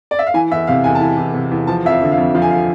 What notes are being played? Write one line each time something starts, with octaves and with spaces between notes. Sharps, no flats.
D5
E5
F5
E3 G#5
E2 E5
C3 F5
E2 G#5
A5
E3 G#5
E2
C3
E2
F3 A5
F2 E5
F5
D3
F5
F2
F3 F5
G#5
F5